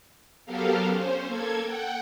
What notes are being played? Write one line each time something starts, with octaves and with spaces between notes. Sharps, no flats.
F#3 B3 G4 A4 A#4 F5
C#4 C5
A#3 A4 G#6
F#5 G5